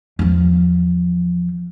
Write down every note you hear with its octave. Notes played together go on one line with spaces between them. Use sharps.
E2 F3